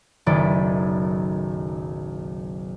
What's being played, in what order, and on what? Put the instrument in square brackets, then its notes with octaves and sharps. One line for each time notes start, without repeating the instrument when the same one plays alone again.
[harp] F#1 B1 D#3 A3 D5